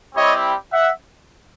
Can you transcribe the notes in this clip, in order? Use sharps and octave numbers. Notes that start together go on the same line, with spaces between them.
G3 C4 E4 G4 C#5 D#5
E5 F#5